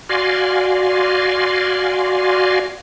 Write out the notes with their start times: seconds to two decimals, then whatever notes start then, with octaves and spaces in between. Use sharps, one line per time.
0.09 F#4 D5 F5 G#5 C6